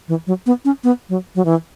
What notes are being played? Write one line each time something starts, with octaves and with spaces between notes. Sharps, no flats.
E3
F#3
B3
C#4
B3
F#3
F#3
E3